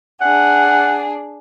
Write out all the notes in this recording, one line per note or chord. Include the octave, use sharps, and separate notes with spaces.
D4 G#4 F#5